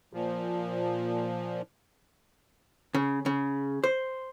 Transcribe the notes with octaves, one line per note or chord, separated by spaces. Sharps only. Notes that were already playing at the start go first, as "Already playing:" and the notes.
A#2 F3
C#3
C#3
C5